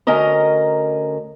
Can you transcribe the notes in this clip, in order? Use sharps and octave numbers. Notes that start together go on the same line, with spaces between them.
D2 C#4 A#4 D#5 A#5